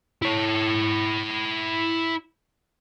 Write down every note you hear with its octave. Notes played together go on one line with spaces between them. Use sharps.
E4 C#5